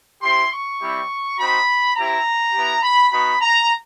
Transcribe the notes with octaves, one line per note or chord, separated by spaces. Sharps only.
C4 E4 G4 C6
C#6
G3 C4 E4 G4
C4 D#4 F#4 B5
C4 E4 G4 A#5
B3 E4 G4
B5
B3 D#4 F#4 B5
A#5